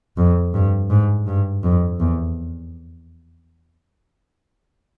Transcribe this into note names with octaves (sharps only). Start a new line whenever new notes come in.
F2
G2
G#2
G2
F2
E2